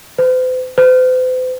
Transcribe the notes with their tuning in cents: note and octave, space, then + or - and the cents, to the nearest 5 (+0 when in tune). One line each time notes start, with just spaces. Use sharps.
C5 -45
C5 -45